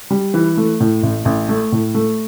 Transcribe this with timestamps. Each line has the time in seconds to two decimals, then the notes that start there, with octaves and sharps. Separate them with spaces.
0.11 G3
0.34 E3
0.57 A3
0.80 A2
1.03 A1
1.25 A1
1.49 A3
1.72 A2
1.94 A3